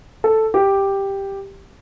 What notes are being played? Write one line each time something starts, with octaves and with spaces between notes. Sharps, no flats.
A4
G4